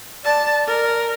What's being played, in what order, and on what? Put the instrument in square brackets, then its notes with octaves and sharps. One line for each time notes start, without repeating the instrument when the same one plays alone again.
[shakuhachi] D5 [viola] A5
[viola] A#4